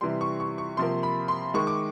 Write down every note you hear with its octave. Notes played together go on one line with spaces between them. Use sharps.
C3 E3 G3 C6
C#6
C#6
C#6
C3 F3 A#3 C6
B5
C6
D#3 G#3 C#6
D6